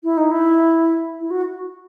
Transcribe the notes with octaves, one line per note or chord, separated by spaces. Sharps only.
E4
D#4
E4
E4
F#4